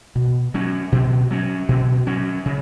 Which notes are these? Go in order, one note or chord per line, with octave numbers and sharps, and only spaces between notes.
B2
F#3 C#4
B2
F#3 C#4
B2
F#3 C#4
C#3